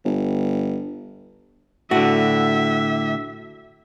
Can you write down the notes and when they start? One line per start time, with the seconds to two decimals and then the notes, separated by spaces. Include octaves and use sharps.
0.05 G1
1.91 A2 D3 F#4 E5